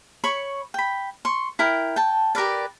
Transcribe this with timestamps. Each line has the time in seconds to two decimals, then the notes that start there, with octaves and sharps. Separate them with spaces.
0.24 C#5 B5 C#6
0.74 G5 B5
1.25 C6 C#6
1.59 E4 A#4 G5
1.96 G5 A5
2.35 G4 A#4 B4 D5